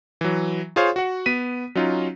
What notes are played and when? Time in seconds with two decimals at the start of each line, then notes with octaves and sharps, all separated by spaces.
0.21 E3 F#3
0.76 F4 G#4 C5 C#5 F5
0.96 F#4 F#5
1.26 B3 B6 D#7
1.75 F#3 C#4 D#4 F4